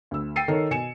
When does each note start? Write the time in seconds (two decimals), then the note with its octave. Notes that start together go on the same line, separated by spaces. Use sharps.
0.11 D2 E6
0.36 G5 E6 A6 C7 C#7 D#7
0.48 D#3 A4 A#4 C#5
0.71 B2 G#5 C#7 E7